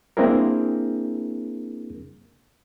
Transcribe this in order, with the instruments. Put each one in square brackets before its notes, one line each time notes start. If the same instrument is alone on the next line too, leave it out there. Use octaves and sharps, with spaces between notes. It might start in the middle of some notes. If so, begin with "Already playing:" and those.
[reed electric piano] A#3 C4 D4 E4 G#4 A#4